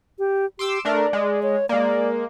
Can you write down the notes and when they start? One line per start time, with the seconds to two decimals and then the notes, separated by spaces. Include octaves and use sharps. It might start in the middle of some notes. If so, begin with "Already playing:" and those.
0.19 G4
0.59 G4 C6 D6 E6
0.85 A3 D4 A#4 D5
1.13 G#3
1.43 C#5
1.69 G#3 A#3 D5